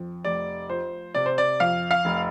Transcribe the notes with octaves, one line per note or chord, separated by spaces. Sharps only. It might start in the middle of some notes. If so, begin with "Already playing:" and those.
Already playing: F2
F1 D5
F3 C5
C3 D5
C5
D5
F2 F5
F5
F1